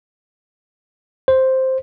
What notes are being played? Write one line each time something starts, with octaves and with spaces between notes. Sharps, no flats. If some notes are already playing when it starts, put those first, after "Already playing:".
C5